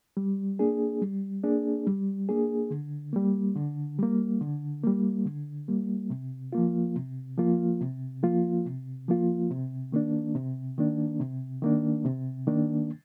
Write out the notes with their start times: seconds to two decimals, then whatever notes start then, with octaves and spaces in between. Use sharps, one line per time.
0.17 G3
0.59 A#3 D4 G#4
1.01 G3
1.44 A#3 D4 G#4
1.87 G3
2.29 A#3 D4 G#4
2.70 D3
3.13 G3 A#3
3.56 D3
3.99 G3 A#3
4.41 D3
4.83 G3 A#3
5.26 D3
5.68 G3 A#3
6.10 C3
6.53 F3 A#3 F4
6.96 C3
7.38 F3 A#3 F4
7.81 C3
8.23 F3 A#3 F4
8.65 C3
9.08 F3 A#3 F4
9.51 C3
9.92 D#3 A#3 D4
10.35 C3
10.78 D#3 A#3 D4
11.20 C3
11.62 D#3 A#3 D4
12.05 C3
12.47 D#3 A#3 D4